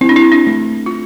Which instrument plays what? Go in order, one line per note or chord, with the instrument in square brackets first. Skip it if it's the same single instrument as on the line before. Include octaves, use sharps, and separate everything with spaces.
[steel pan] C4 [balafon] E4
[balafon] D4
E4
D4
[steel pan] A3
[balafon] F4